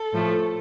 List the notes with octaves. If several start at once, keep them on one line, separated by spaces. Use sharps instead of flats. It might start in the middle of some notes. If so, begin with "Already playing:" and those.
Already playing: A4
A2 F3 A3